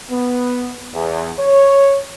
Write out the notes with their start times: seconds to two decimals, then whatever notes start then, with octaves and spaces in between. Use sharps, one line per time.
0.10 B3
0.93 E2
1.38 C#5